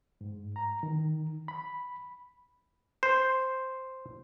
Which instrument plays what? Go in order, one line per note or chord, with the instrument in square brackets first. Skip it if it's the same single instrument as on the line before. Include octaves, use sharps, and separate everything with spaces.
[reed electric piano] G#2
A#5
D#3
B5
[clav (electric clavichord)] C5